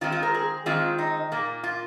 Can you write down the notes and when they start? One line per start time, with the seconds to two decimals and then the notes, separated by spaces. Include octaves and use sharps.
0.01 D#3 G#3 C4 F4
0.12 F4
0.23 A#4
0.34 G#4
0.66 D#3 G#3 C4 F4
0.98 D#4
1.32 A#2 A#3
1.63 F4